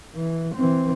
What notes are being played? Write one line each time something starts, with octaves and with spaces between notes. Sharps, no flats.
E3
E3 C4